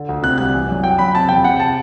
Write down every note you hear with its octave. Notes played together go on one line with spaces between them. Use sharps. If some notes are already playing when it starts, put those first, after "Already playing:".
Already playing: D3
D2
C3 F#6
C2 F#6
E3
F#2
F#3 G5
F#2 B5
C3 A5
E2 G5
C3 F#5
A5